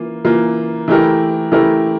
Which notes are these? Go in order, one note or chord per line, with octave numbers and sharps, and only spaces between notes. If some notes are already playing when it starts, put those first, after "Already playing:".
Already playing: E3 A#3 F4
E3 A#3 F4
E3 A3 E4 G4 A#4
E3 A3 E4 G4 A#4